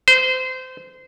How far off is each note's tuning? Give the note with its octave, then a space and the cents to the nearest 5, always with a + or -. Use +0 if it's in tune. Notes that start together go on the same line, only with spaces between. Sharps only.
C5 -25